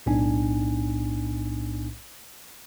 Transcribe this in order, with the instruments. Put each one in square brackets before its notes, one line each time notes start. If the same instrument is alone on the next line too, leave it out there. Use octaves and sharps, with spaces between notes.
[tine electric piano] B1 A2 B3 D4 D#4 G#5